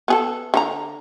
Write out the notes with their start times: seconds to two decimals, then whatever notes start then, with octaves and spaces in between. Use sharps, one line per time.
0.08 B3 G#4 A4
0.54 D3 C#4 A#5